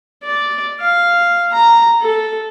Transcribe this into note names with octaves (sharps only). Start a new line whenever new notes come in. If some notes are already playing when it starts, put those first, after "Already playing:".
D5
F5
A#5
A4